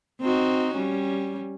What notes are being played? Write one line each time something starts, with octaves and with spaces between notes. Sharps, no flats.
C4 D#4 F#4
G3 C#4